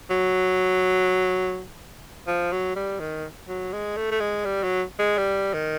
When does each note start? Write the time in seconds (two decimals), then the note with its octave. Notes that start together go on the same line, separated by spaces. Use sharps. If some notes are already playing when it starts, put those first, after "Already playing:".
0.10 F#3
2.27 F3
2.52 F#3
2.76 G3
3.00 D#3
3.48 F#3
3.73 G#3
3.97 A3
4.11 A3
4.20 G#3
4.45 G3
4.63 F#3
4.99 G#3
5.18 G3
5.54 D#3